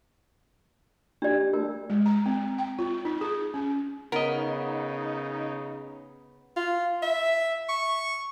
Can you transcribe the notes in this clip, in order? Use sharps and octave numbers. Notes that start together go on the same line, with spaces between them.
D4 G4 D5
A3 A#4
G#3
A#5
C4
G5
F4
D#4
G#4
C#4
C#3 B3 D#4 A#4 D#5
F4
E5
C#6